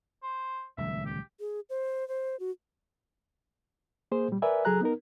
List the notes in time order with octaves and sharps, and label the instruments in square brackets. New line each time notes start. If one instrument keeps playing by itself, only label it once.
[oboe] C5
[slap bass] D#1 C#2 F#3 [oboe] E5
[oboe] G4
[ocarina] G#4
C5
C5
F#4
[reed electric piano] A#3 G#4 C5
A#2 G3
A#4 B4 D5 E5 G#5
C#2 F#3 G#4 A4 A#5 F#6
B3 D#4 A#4